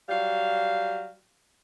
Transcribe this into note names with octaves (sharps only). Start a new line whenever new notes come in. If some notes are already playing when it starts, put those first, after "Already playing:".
F#3 G3 F5